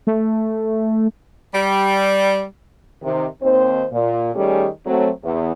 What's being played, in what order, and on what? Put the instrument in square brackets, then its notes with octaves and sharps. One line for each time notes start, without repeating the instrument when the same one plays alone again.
[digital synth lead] A3
[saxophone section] G3
[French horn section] C3 D#3
D#2 C4 C5
A#2
D#3 G3 A3 C#4 G4 G#4
F#3 A3 C4
E2